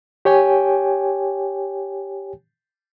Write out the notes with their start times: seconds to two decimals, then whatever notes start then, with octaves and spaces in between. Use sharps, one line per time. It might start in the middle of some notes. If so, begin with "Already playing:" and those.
0.25 G4 C#5 G5 G#5